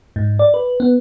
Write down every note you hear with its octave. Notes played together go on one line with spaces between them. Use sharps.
G#2
D5
B4
B3